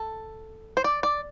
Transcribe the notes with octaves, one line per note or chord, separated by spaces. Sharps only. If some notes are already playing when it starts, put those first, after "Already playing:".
Already playing: A4
C5
D5
D5